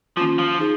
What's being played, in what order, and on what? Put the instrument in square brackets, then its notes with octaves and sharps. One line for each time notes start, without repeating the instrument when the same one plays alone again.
[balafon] D#3 A#3 C#4 F4 [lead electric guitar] F3
[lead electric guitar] F3
[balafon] D#4 G#4